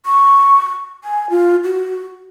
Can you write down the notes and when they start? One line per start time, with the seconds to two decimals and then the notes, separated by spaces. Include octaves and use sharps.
0.06 C#6
1.04 G#5
1.30 F4
1.64 F#4